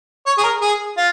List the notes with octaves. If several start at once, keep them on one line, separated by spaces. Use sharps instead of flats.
C#5
G#4
A#4
G#4
F4